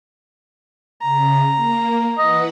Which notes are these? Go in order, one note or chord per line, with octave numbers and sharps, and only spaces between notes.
C#3 A#5
A#3
E3 B4 D#5 F#5